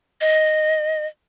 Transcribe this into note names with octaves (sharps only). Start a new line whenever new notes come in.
D#5